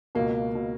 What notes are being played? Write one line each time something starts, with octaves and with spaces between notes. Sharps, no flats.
C#2 B2 A#3
B2